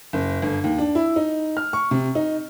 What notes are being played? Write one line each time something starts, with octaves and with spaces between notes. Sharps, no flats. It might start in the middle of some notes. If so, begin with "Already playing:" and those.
F#1
G1
D#2
D4
E4
D#4
F6
C#6
C3
D#4